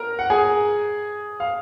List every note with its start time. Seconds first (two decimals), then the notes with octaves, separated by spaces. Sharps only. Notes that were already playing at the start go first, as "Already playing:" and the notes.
Already playing: A#4 A#5
0.19 F#5
0.30 G#4 G#5
1.40 F5